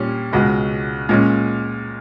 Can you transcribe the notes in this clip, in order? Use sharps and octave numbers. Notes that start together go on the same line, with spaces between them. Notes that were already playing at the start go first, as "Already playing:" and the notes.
Already playing: A#2 G3 C#4
C#2 B2 G#3
A#2 G#3 C#4